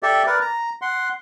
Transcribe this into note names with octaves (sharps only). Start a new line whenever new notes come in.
G4 A4 D5 E5
A#4 B4 D5
A#5
F#5 C6